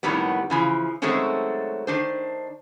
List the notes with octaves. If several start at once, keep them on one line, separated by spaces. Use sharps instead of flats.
F2 A2 D#3 F#3 G3 B3
C#3 E3 F3
D#3 F#3 G#3 A3 C4 C#4
D#3 D4 C5